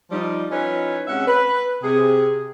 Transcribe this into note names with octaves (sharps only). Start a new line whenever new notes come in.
F3 G3 D#4
F3 C#4 D#4 E4 B4 C#5
C3 G#3 C#4 E5 F#5
B4
C3 G#4